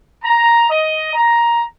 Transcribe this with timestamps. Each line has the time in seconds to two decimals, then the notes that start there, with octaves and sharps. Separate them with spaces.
0.23 A#5
0.69 D#5
1.14 A#5